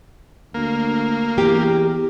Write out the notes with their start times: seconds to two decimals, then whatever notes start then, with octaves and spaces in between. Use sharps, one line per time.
0.54 D2 A#3
1.38 E2 G4